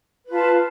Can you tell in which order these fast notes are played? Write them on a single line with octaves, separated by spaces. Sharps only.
B4 F4 A5